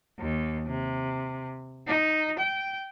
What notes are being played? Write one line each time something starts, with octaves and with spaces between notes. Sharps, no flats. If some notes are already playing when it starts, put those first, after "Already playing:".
D#2
C3
D#4
G5